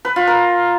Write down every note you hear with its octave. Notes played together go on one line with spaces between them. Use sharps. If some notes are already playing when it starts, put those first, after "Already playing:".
B4
F4
A#4